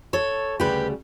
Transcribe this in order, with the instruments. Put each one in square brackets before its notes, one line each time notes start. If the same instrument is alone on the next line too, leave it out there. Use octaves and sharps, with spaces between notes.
[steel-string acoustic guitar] A4 C#5
D2 C#3 G3 G4 B4